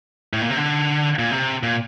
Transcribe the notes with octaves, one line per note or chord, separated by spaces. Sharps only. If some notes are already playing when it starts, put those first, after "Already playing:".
A2
A#2
C3
D3
A#2
C3
A#2